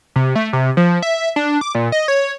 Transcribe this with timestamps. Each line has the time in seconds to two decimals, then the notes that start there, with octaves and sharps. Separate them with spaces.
0.16 C3
0.35 A3
0.53 C3
0.77 F3
1.02 E5
1.36 D4
1.61 D6
1.75 A#2
1.92 D#5
2.08 C#5